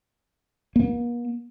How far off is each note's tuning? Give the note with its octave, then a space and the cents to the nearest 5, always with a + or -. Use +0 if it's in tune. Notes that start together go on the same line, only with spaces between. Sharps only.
A#3 +45